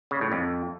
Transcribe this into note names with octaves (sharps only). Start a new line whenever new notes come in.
C#3
A2
F2